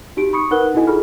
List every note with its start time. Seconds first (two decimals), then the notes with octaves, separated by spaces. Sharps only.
0.17 D#4 F#4 G4 D7
0.33 B5 C#6 D#6 C#7
0.51 D#4 A#4 B4 F#5 F#6 G7
0.74 D#4 E4 F#4 A4 D#5 G#5
0.87 F4 G#4 A4 B5 F6